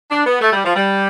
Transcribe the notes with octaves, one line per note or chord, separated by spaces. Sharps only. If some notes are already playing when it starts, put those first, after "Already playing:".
D4
B3
A3
G3
F3
G3